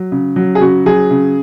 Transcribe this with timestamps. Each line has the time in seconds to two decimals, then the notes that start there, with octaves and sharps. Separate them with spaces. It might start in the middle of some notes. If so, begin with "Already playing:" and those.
Already playing: F#3
0.12 C#3
0.36 F#3
0.55 G#4
0.61 C#3 F#4
0.86 F#3 G#4
1.11 C#3